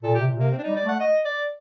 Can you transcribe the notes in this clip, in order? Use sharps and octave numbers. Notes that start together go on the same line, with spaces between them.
A#2 A4
G4
C3
A#2
C3 A#3
C4
D4
D#4
G3
D5
A3 F#5
D#5
D5